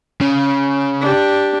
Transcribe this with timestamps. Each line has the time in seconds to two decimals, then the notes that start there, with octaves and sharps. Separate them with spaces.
0.21 C#3
1.02 D4 G4